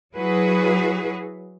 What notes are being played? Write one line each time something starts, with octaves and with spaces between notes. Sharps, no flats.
F#3 E4 F#4 G#4 B4